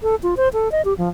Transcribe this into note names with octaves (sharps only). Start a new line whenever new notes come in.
A4
F4
C5
A4
D#5
G4
F3